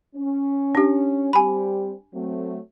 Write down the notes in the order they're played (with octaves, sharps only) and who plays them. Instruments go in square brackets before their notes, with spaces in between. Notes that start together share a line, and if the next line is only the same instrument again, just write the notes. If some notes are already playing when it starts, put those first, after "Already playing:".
[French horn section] C#4
[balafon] D4 G4
[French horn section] G3 C4 G4 [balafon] G#5 B5
[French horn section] F#3 A3 C4